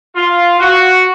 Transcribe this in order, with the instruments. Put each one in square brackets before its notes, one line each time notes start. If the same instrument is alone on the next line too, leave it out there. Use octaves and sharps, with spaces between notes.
[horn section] F4
F#4